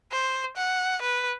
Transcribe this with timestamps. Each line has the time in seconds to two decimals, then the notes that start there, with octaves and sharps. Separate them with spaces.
0.12 C5
0.56 F#5
1.02 B4